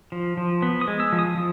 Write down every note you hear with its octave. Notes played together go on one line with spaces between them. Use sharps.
F3
F3
B3
D#6
G#3
E6
F3
D#6
F3